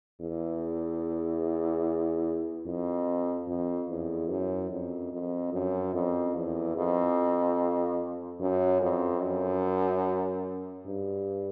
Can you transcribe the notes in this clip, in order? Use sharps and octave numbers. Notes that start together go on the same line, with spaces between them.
E2
F2
F2
E2
F#2
F2
F2
F#2
F2
E2
F2
F#2
F2
F#2
G2